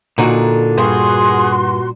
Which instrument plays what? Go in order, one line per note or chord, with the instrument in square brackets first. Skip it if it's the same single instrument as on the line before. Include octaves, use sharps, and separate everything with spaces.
[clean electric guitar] A#2 [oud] D3 D#4 F#4
[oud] G2 [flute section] F#4 C6 [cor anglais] G#4